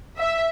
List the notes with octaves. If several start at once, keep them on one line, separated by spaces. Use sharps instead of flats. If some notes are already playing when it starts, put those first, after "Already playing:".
E5